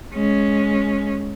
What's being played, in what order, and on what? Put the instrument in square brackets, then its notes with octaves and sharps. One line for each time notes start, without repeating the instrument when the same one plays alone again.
[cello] G#3 C#4